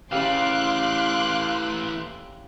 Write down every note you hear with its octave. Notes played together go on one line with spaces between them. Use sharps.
C#3 E3 A3 G4 F5 C6 D6 F#6